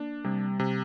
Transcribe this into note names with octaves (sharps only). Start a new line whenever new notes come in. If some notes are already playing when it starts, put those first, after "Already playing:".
Already playing: A#3 D4
C3 G3
C3